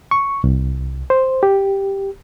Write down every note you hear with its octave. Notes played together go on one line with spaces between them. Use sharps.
C#6
C2
C5
G4